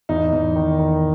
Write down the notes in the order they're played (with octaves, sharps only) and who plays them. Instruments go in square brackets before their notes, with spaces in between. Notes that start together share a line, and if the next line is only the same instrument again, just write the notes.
[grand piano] E2 D#4
E2
D#3
D#3